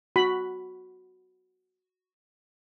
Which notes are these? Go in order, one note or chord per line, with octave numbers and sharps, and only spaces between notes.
F#4 B5